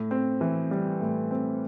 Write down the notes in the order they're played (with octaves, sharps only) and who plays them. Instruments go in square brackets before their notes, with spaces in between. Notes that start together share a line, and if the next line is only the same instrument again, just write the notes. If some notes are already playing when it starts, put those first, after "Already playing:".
Already playing: [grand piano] A2
C4
E3
G3
A2
C4